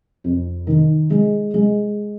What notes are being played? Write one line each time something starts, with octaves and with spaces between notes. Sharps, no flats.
F2
D#3
G#3
G#3